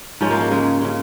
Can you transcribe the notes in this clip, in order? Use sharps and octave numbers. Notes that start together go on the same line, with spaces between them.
G#2 F3 G#3 C#4
A#3
G#3
C#3 G#3
C#3 G#3